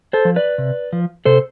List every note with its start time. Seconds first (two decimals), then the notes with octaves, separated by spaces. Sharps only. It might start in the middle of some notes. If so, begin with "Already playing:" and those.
0.13 A4 C5
0.25 F3
0.36 B4 D5
0.58 C3
0.93 F3
1.25 C3 A4 C5